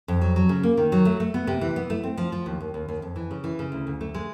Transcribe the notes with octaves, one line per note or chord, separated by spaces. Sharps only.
F2
F#3
F#3
C#3
A#3
D#3
F#3
A3
A3
B3
C3
E3
B3
A3
C4
F3
F3
D#2
D#2
D#2
D#2
F2
E3
C#3
E3
C#3
D2
D2
A3
G#3